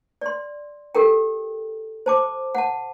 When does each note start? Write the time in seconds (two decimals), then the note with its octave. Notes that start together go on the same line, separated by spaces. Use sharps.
0.21 D5 C6
0.95 G4 A4 A#4 G5
2.06 C5 A5 D6
2.55 F#5 A5